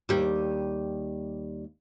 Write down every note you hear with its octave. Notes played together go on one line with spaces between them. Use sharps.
D#2 G3